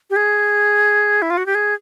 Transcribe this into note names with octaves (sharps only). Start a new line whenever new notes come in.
G4
G#4
E4
F4
F#4
G4
G#4